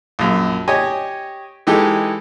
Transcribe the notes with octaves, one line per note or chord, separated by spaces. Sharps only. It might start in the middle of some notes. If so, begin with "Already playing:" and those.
A#1 F#2
G4 C#5 D#5 G#5
E3 G#3 D#4 G4 A4